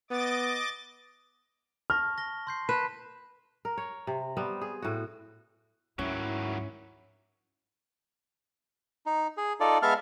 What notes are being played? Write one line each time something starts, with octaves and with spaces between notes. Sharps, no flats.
B3 D#5 D6 A6
A5 C#6 F6 A#6
A#6 G7
C6 G6 C7
B4 A5 E7
A#4
C#5
C3
G3 B3 C4
G#4
A2 F#4
D2 G#2 D#3 F#3 C#4 E4
D#4
G#4
D#4 F4 A4 D5
G#3 B3 E5 F5 A5 F6